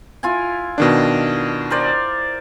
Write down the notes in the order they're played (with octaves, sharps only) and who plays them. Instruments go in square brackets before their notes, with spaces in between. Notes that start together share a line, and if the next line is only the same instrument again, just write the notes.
[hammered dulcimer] E4 F4 G#5
[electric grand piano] B2 D#3 D4
[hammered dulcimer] A#4 C5 D5